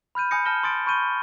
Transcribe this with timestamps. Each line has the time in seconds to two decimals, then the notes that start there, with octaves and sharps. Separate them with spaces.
0.15 B5 F6 G6 D#7
0.31 G#5 B5 D#6 G6 A#6 C#7
0.45 A5 F6 G6 A#6 E7 G7
0.63 C6 D#6 A6 D7
0.86 B5 C#6 F6 G6 D#7 G7